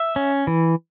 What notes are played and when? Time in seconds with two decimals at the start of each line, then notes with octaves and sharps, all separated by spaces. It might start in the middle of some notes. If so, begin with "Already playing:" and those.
Already playing: E5
0.16 C#4
0.47 E3